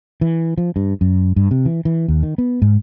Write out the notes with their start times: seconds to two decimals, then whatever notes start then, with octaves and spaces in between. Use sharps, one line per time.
0.21 E3
0.58 F3
0.76 G2
1.01 F#2
1.36 G2
1.51 C3
1.66 E3
1.85 E3
2.08 D#2
2.23 D#3
2.38 B3
2.62 G#2